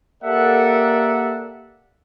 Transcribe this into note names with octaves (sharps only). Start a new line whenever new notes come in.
A#3 G4 A4 D5 E5 F#5